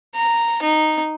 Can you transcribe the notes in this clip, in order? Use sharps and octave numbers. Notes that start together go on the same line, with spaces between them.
A#5
D#4